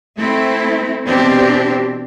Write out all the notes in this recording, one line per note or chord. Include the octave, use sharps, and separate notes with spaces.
A3 C4 E4
B2 E3 C4 D4 G4